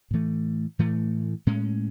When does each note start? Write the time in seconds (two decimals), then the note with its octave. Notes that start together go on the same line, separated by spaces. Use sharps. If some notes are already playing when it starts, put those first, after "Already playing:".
0.11 A2 E3 A3
0.79 A2 E3 A3
1.47 A2 G#3 C#4